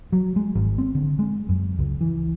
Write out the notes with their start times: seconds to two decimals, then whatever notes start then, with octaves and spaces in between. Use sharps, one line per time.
0.12 F#3
0.36 G#3
0.55 G#1
0.78 C4
0.95 D3
1.19 G#3
1.49 F#2
1.79 C#2
2.01 E3